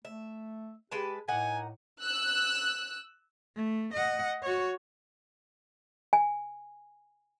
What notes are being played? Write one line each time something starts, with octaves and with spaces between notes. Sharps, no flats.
A3 E5
G#3 G4 B4 A5
A2 A#3 D#4 F#5 G#5
E6 F#6
A3
D#5 F#5
F#4 C#5
G#5